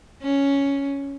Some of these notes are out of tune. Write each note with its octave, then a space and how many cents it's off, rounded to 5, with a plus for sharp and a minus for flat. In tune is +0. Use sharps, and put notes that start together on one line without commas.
C#4 +5